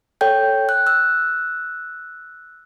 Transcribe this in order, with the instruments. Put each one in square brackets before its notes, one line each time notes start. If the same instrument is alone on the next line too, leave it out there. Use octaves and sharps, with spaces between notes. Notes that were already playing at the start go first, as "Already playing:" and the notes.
[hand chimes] A4 C#5 G5 G6
F#6
E6 F#6